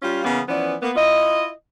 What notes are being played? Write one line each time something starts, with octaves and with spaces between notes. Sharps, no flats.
G3 C#4 F4
C#3 E3 A#3 B3 C#4
E3 F3 B3 C#4 D5
A#3 B3
E4 F4 D#5